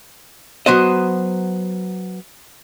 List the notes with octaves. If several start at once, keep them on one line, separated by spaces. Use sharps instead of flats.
F#3 B3 C5 D#5